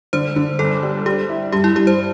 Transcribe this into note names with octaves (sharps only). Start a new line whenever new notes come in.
D3 C5
D3
G1 A4
G3
G3 G4
E4
G2 G4
E4
G2 G4
C5